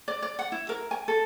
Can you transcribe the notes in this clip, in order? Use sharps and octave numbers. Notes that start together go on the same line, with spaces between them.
D5
D5
F#5
E4
A#4
G#5
A4